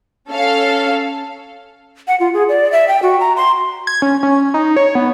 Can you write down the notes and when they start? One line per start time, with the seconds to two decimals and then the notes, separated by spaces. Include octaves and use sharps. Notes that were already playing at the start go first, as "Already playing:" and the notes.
0.29 C#4 A4 F5
2.08 F#5
2.20 F4
2.34 G#4
2.49 D5
2.72 E5
2.88 G5
3.03 F#4
3.20 A#5
3.36 C6
3.87 G#6
4.02 C#4
4.23 C#4
4.54 D#4
4.76 C#5
4.95 B3